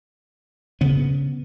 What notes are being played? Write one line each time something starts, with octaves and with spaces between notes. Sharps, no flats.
C#3 B3